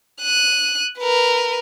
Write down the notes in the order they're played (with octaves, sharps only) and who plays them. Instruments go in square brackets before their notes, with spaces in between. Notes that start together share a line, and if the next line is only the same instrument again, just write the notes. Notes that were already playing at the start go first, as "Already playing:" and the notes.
[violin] F#6 D#7
A#4 B4